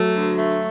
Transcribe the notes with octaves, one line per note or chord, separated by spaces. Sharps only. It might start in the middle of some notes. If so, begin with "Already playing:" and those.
Already playing: F#3 A3
D2
A3